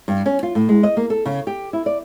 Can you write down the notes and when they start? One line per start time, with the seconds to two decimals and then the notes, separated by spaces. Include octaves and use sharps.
0.08 G2
0.26 C#4
0.43 F4
0.55 A2
0.69 G#3
0.83 D#5
0.97 A#3
1.10 A4
1.25 C#3
1.47 G4
1.73 E4
1.86 D5